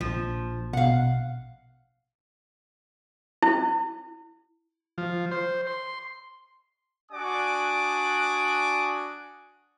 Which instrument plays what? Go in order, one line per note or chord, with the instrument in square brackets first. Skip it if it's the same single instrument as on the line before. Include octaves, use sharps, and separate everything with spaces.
[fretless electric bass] A#1 [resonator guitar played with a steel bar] F3
[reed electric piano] B2 [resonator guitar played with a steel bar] F5 F#5
[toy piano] E4
[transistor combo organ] F3
C5
C6
[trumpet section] D4 F#4 D5 G#5 D6 D#6